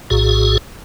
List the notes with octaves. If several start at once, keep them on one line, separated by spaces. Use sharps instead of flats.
A#1 A2 F#4 G#4